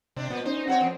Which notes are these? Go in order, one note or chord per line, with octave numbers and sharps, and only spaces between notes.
C3 C4 D4
A#2 B3
C#4 D#4 C5
C4 F#4 A4 C#5 F#5
F2 D#3